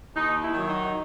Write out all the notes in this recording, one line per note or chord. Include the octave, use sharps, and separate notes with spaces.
D#2 D#4
E4
D#3 F#3
D#4